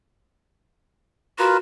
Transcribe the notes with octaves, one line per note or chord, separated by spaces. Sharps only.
F4 F#4 A#4 B4